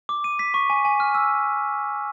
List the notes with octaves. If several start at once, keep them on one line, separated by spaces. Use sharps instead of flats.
D6
D#7
B6
C#6
G#5
G#5
F6
E6